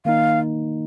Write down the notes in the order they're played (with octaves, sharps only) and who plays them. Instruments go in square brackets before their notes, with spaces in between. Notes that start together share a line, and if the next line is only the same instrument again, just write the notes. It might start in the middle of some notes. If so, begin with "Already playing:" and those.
[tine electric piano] D#3 A#3 D#4 [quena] F5